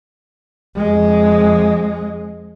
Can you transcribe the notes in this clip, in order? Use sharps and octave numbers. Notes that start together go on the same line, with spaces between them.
F2 G#3